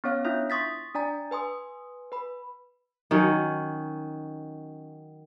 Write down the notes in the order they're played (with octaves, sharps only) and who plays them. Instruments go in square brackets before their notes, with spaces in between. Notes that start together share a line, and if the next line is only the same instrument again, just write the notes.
[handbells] B3 C#4 C#5 F5 F6 F#6
D4 E4 F4 E5 G6
C6 C#6 D#6 A6 B6
D4 D5 G#5 A#5 A6
B4 G#5 C6 D#6
B4 B5
[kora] D#3 F#3 C#4